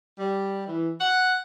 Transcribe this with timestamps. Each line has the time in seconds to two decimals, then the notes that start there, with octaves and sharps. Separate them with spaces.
0.18 G3
0.67 E3
1.00 F#5